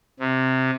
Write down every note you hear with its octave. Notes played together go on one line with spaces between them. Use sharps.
C3